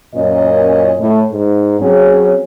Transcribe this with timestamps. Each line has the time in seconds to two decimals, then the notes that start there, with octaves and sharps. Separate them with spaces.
0.15 F#2 A#2 C#4 A#4 D#5
0.99 A2
1.32 G#2
1.79 F#3 C4 C#4 G#4